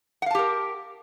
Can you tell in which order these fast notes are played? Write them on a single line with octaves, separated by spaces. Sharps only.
F#5 F5 A5 G4 A#4